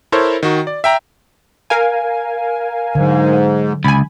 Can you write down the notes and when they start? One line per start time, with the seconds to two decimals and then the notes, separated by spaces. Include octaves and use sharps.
0.12 E4 A4 A#4 C5 C#5
0.43 D#3 F#4
0.67 D5
0.84 E5 G5 A#5
1.70 A#4 F5 G#5
2.95 G#2 D3 F#3
3.84 C#2 G#5 B5